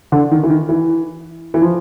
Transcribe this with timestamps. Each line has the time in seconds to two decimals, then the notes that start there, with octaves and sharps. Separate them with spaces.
0.12 D3
0.31 D#3
0.43 E3
0.50 D#3
0.69 E3
1.54 E3
1.62 F3